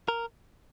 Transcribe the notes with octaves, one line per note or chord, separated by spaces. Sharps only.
A#4